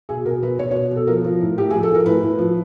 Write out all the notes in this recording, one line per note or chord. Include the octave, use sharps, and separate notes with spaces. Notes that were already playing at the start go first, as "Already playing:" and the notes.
B2 G#4
B2 A#4
B2 B4
B2 C#5
B2 C#5
B2
A4
F3 A#4
F3
A2
A2 G4
F3 G#4
A4
F3 A#4
A2 B4
A2
F3